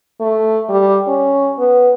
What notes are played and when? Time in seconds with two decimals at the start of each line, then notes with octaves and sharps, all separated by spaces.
0.20 A3
0.69 G3
1.08 C#4
1.58 B3